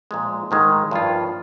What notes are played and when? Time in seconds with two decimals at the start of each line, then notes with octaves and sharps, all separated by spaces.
0.11 A#2 F3 G#3
0.51 G#2 D#3 G#3
0.91 G2 F3 A#3 F4